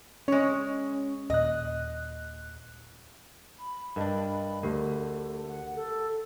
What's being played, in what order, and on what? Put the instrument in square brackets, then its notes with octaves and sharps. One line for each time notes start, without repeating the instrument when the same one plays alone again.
[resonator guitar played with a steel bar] G#3 C#5 [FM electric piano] C#4
[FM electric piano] D#2 A#2 F#6 [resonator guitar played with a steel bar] D#5
[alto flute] B5
[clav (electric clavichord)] G2 D4 [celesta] A#4 D#5
[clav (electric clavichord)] D2 [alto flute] A3 [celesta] G4 A#4
[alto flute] F#5
A4